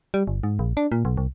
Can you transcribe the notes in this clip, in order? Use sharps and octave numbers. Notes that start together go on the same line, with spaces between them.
G3
G1
G#2
A#1
D4
A#2
B1
C2